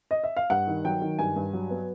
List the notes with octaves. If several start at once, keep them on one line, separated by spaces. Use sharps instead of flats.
D#5
E5
F5
G2 F#5
D#3
F#3 G5
D#3
G2 G#5
G2
F#3
B3